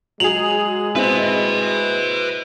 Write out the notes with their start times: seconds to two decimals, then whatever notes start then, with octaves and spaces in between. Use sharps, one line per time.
0.20 F#3 G#3 G#4 F7 F#7
0.95 C4 E4 B4 D#5